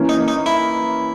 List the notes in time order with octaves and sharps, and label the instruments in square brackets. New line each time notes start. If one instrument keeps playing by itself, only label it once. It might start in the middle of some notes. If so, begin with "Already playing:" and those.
Already playing: [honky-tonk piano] E3 A#3 C#4
[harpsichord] D#4
D#4
E4